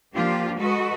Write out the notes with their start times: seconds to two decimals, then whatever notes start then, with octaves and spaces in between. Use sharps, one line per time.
0.13 F3 A#3 D4 F4 G4
0.59 G#3 F#4 A4 B4 D#5